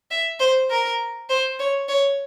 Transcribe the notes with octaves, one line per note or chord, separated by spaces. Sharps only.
E5
C5
A#4
C5
C#5
C#5